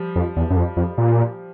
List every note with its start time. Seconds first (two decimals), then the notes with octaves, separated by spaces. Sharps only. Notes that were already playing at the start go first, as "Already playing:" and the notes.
Already playing: F3 G3
0.16 F2
0.37 E2
0.50 F#2
0.57 F2
0.77 F2
0.98 A#2